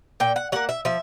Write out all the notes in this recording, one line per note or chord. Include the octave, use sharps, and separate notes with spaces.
A#2 G5
F#5
F#3 A#3 F#5
E5
F3 E5